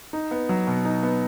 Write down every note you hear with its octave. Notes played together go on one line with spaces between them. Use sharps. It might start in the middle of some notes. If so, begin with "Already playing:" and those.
D#4
B3
F#3
B2
D#4
B3